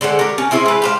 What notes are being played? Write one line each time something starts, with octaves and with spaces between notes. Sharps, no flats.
D3 G#3 C5 F#5
G4 A#4
C#4
C4 E4 G#4 C5
G#3 B4
G4 C5 F5